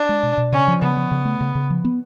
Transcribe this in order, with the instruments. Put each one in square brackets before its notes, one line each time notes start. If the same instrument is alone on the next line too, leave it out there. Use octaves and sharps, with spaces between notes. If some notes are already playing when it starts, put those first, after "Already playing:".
Already playing: [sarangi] D4
[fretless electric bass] G#3
B2
B2
[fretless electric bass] C#3 [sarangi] C#4
[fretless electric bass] F3
[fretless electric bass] C#3 [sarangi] B3
[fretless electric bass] F3
C#3
A3
C#3
C#3
F3
B3